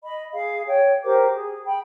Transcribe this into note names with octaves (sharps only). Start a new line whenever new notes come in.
D#5 B5
G#4 F5
C#5 G5
G4 A#4 C5 D6
G#4
G5 B5